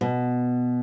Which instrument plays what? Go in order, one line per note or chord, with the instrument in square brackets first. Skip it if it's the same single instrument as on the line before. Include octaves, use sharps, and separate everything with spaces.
[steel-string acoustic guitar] B2